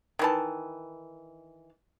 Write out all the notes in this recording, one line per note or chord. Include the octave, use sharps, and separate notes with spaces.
D#3 E3 A5